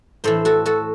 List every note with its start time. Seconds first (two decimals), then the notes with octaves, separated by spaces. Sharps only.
0.24 A2 E3 A4 C5
0.45 F#4 A4
0.66 F#4 A4